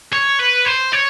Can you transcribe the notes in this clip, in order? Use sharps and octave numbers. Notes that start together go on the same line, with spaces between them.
C#5
B4
C5
C#5